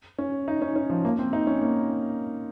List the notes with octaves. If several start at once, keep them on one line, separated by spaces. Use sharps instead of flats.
C#4
D#4
C#4
C#4
F3
A#3
C4
D#4
C#4
A#3